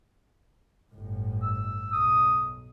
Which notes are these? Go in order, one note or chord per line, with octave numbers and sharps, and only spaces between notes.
G1 A2
E6
B1 D#6